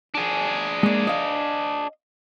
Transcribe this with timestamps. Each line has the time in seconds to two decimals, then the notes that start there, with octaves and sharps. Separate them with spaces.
0.15 D4 G#4
0.83 G#3 A#3
1.07 D#5 F5